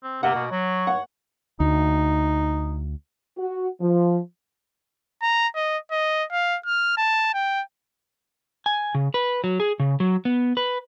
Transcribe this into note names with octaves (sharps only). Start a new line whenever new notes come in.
C4
C3 A#3 F#5
B2
F#3 C#5
F#5
D2 D#4
F#4
F3
A#5
D#5
D#5
F5
F6
A5
G5
G#5
C#3
B4
F#3
G#4
C#3
F#3
B3
B4